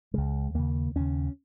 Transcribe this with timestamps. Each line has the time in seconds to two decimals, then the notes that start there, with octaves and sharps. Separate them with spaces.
0.14 C#2 C#3 G#3
0.54 D#2 C#3 A#3
0.95 D#2 C#3 C#4